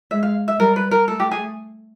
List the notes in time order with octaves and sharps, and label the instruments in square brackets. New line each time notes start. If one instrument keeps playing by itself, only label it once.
[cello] G#3 [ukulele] E5
[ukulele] F5
E5
[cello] G3 [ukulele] A#4
[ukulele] B4
A#4
[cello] A3 [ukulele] A4
[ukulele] G4
G#4